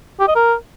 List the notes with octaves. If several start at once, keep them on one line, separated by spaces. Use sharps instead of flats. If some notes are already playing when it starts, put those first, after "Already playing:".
G4
D#5
A#4